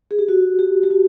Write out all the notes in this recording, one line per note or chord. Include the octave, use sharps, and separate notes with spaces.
G#4
G4
F#4
G4
G4
F#4